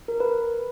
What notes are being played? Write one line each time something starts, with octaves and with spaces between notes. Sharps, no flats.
A#4
B4